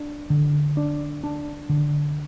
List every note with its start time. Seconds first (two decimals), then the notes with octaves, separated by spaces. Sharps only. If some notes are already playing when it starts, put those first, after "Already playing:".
Already playing: D4
0.30 D3
0.77 D4
1.24 D4
1.69 D3